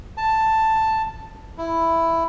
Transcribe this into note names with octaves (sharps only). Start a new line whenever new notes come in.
A5
E4